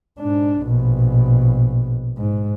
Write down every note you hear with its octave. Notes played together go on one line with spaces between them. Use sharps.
G#2 D4
A#1 B2
G#2